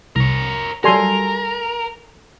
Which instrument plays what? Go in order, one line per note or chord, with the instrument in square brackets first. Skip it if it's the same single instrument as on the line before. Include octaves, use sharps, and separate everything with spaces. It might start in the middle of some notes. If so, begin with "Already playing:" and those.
[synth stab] C2 [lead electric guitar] A#4 C#5
[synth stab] F#3 G3 [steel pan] A4 G#5 C6 [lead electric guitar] A#4